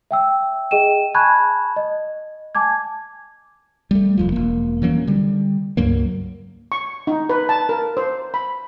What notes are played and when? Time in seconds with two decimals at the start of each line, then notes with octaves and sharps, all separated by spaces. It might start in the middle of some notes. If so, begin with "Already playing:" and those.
0.11 E5 G5 E6
0.71 G#4 D#5 G5 D#7 E7
1.14 G#5 A5 B5 C#6 F#6 G#6
1.76 D#5
2.55 G#5 A5 D6 G#6
3.91 G3 A3
4.17 F1 F2 F3
4.32 E1 A#3
4.82 E3 F#3 A#3 C#4
5.07 D3 G3
5.77 C#2 G2 F#3 A#3
6.72 C#6
7.07 D#4
7.30 B4
7.49 A5
7.69 A#4
7.97 C5
8.34 B5